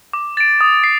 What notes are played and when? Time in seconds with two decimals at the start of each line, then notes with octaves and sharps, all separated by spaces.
0.13 D6
0.37 A6 D7
0.61 D#6
0.84 C7